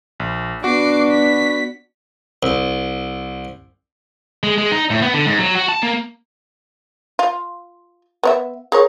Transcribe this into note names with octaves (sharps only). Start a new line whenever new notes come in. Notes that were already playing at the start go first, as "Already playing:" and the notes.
A#1
B3 D4 F#4 D6 C7
B6
C2
G#3
G#3
D#4
A2
B3
D3
G#2
F#3
F#4
A5
A#3
F4
B3 C#5 E5
G#4 A#4 C#5